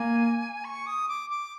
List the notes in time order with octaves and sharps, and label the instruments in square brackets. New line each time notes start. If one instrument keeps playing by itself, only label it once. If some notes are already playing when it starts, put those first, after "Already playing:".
Already playing: [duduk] A#3 [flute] G#5
[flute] C#6
D#6
D6
D6